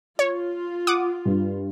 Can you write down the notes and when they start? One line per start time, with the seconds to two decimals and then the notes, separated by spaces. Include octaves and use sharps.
0.19 F4 C#5
0.87 F#5 D6 D#6
1.25 G2